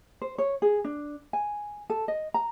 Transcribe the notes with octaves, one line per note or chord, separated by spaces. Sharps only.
C5
C#5
G#4
D4
G#5
A4
D#5
A#5